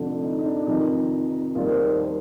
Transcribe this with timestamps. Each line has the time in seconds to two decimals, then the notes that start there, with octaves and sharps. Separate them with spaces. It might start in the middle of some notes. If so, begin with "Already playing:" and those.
Already playing: F1 F2 D3 A3
0.23 D#4
0.39 D#4
0.45 D4
0.67 F1 F2 D#3 D#4
1.55 D#2 D#3 G3 F4
1.70 C5
1.85 C5
1.99 A#4